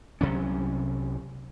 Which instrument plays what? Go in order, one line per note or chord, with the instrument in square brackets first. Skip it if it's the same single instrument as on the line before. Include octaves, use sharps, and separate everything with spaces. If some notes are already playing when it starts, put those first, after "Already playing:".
[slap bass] C2 C3 F#3 C#4